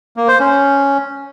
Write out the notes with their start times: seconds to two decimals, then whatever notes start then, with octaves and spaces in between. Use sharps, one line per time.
0.17 A#3
0.28 C5
0.40 C#4